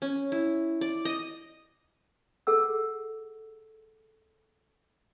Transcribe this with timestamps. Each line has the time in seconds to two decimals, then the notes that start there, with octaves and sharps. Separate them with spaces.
0.02 C#4
0.32 E4
0.81 D5
1.05 D#5
2.47 G#4 A4 F#5 E6